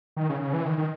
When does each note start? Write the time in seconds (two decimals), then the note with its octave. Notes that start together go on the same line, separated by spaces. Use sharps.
0.16 D#3
0.29 C#3
0.42 C#3
0.53 E3
0.66 D#3
0.78 D#3